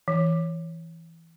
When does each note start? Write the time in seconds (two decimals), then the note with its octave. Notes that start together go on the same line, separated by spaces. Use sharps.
0.08 E3